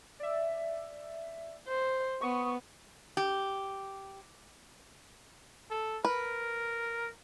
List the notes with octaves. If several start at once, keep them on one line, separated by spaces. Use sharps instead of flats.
D5 E5
C5
B3 C#6 D#6
G4
A4
A#4 B4